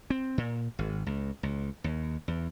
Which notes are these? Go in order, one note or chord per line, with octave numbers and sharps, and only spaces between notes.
C4
A#2
G#1
C#2
C#2
D#2
E2